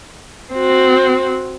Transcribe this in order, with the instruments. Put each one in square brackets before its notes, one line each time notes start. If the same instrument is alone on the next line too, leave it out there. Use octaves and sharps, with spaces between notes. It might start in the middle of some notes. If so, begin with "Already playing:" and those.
[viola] C4 F#4